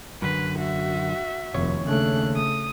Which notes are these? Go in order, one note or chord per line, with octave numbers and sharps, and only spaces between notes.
F#2 D3 B4
F#4 E5
F1 D#2 C#5
C#3 A3 D4 F#6
D#6